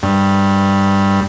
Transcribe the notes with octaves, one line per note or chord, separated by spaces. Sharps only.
G2